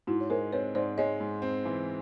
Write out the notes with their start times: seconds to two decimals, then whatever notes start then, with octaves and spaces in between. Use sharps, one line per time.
0.07 G#2 E4 F#4
0.20 C#5
0.30 G#3 A#4 C5
0.53 C4 B4 C#5
0.75 G#2 C5 D5
0.98 G#3 C#5 D#5
1.20 G#2
1.42 C4
1.65 E3